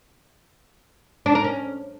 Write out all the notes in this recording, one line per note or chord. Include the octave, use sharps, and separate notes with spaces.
D4
A#4
C#4